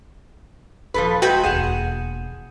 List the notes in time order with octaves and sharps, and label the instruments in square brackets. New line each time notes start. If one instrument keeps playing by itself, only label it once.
[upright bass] D#1 [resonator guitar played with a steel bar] F3 A4 B4
[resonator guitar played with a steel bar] G#3 [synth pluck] F#4 B4 [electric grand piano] G5 G6
[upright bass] E1 D#2 [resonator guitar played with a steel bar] G#4 F#5 [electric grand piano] D#7 E7